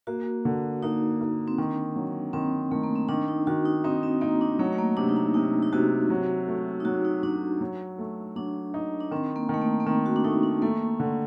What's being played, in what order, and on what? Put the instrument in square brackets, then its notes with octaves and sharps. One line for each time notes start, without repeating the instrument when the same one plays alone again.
[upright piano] A#3 [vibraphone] F#4
[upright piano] D3
[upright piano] A#3 [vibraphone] D#4
[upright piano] A#3
[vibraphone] C4
[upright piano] D#3 [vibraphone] D4
[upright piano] F#3
[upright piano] D#3 [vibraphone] C4
[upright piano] D#3 [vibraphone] A3
[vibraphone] A#3
C4
[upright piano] D#3 [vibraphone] D4
[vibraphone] D#4
[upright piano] D#3 [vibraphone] F#4
[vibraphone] D#4
[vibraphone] C4 [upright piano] D#4
[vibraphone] C4
[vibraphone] A#3 [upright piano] D#4
[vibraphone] D4
[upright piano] F#3 [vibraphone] A3
[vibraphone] A3
A#3
[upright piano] C3 [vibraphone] D4
[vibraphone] D#4
D4
[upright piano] C3 [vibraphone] D#4
[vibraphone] D#4
[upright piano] C3 [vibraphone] F#4
[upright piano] F#3
A3
[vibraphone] D#4
[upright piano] F#3 [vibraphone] F#4
[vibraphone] D#4
[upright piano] F#3 [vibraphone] D4
[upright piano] F#3
A3
[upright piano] F#3 [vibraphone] D4
[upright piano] D#4
[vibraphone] D4
[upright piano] D#3 [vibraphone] C4
[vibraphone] A#3
[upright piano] D#3 [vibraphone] A3
[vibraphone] A#3
A#3
[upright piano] D#3 [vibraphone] C4
[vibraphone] F#4
D4
[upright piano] A3 [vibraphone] D#4
[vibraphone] D4
[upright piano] A3 [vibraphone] A#3
[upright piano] D3